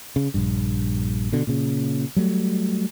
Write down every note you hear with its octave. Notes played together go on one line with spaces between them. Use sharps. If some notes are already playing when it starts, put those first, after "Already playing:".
C#3
A#1 G2
B2 D3
A#2 C#3
F#3 G3 A3